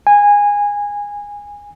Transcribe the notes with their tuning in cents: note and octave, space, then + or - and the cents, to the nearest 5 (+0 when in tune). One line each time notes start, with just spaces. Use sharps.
G#5 -20